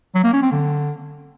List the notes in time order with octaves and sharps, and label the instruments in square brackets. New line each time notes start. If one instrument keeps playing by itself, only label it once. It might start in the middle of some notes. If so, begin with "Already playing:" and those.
[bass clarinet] F#3
A#3
C#4
C4
D3